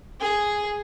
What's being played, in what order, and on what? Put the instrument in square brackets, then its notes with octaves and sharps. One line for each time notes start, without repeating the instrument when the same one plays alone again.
[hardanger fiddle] G#4